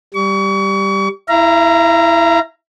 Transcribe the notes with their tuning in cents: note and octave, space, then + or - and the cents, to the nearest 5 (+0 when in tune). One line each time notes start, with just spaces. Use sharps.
G3 +0 C#6 +35
E4 +0 F5 -45 A#5 +0